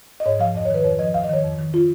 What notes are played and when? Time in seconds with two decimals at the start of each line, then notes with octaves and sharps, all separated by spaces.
0.20 D#5
0.26 G#2 C#5
0.39 F3 F5
0.54 F2 D#5
0.65 C#5
0.70 D#3 B4
0.84 F2 C#5
0.99 F3 D#5
1.14 D#2 F5
1.24 D#5
1.29 D#3 C#5
1.44 F2
1.59 D#3
1.74 F4